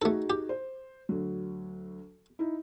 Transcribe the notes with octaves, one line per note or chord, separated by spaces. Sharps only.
A3 D#4 F#4 G#4 A4
G4
C5
D2 F#3
D#4 E4